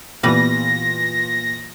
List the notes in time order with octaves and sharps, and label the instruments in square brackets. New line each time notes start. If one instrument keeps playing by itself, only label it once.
[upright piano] A#2 B3 [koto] E3 G3 B4 [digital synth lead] A#6